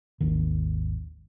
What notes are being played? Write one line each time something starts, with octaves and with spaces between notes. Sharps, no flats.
G#1 D#2 D#3